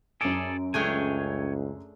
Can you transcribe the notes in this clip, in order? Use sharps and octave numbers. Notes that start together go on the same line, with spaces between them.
F#2 G#4 A4 D5 D7
C#2 A3 D4 G#4 C#5 G5 G#5